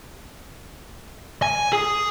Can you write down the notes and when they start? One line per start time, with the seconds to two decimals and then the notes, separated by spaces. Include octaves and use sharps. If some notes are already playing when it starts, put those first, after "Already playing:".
1.42 G#5
1.73 G#4